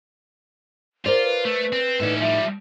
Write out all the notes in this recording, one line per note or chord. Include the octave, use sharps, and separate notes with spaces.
F4 A#4 C5 D5
B4
A3
C4
A2 C#4 D#4 A4 D5
F3 G3 E5